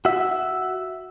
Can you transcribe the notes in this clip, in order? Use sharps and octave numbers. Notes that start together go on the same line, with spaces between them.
F#4 E5